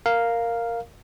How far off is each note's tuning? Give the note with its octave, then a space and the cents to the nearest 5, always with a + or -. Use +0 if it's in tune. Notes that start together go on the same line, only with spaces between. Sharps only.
A#4 -5 F5 +0